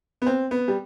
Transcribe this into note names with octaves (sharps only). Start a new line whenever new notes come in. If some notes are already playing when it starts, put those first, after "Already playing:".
B3
C4
B3
G3